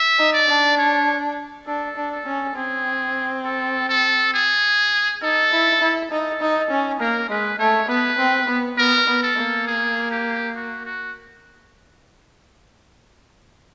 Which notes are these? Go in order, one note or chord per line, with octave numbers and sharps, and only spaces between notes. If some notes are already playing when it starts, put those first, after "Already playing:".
Already playing: E5
D#4
D5
D4
C#5
D4 A4
D4
A4
C#4
C4 G#4
A4
A4
G#4
D#4 A4
E4
E4
D#4 A4
D#4
C#4
A#3 A#4
G#3 B4
A3 C#5
B3 B4
C4
B3
B3 A#4
B3
A4
A#3
G#4
G4
F#4
F#4